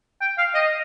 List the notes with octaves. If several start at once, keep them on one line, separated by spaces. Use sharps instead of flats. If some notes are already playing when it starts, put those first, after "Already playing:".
G5
F5
D#5